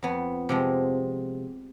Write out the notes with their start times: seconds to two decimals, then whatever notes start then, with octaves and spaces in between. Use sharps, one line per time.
0.03 F2 B3
0.49 C3 F3 G#3